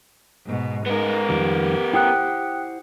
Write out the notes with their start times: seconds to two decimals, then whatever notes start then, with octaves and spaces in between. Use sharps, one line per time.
0.45 G#2 B2
0.86 G#3 B3 D#4 A#4
1.29 F2 D#3 G3 G4
1.93 E4 C5 F#5 G5 D#6 F#6